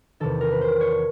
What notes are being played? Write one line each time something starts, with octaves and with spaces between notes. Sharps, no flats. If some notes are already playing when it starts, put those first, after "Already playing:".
E2 C3 D#3 A4
A#4
B4
C5
C#5